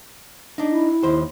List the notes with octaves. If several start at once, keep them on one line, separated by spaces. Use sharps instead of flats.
D4 D#4
E4
D#2 C5